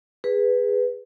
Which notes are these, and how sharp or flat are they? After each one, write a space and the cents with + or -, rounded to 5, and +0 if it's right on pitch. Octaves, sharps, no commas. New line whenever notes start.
G#4 -20 B4 +0